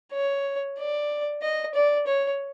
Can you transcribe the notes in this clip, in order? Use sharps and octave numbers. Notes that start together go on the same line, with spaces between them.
C#5
D5
D#5
D5
C#5